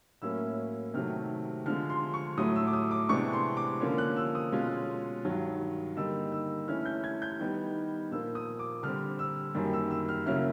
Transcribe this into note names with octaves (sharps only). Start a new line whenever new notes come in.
A2 F#3 A#3 C#4 E4 E6
C3 D#3 F#3 A3 F6
D3 F3 G#3 F6
C6
C#6
A2 F#3 A3 D#6
E6
D6
D#6
D6
C3 E3 G#3 B3 D4 C#6
C6
D6
D3 F3 A#3 C#4
F#6
E6
D#6
B2 G#3 C#4 F4
G2 D#3 F#3
D3 G3 A#3 D#4 E6
E6
E3 A3 C#4 E4 F6
G6
G#6
G6
D#3 G3 B3 D#4
A#2 F3 A#3 E6
D#6
D6
D3 G3 C4 F6
E6
F#2 D#3 G3 A#3
E6
E6
F6
C#3 F#3 A#3 C#4 E4 F6